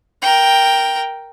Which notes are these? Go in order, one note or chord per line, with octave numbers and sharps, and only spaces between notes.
A#4 G5